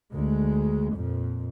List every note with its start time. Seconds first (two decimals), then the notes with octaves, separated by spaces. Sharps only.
0.12 D2 G#3
0.93 F2 A#2